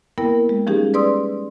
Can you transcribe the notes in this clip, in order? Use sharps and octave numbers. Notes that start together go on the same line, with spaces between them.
A#3 B3 E4 A#4 G5
G#3
F3 G3 C#4 D#4 G4 G#4
B4 D5 C6 D#6 E6